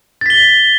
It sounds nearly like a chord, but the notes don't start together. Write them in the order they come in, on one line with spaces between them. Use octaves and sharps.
A6 B6 G7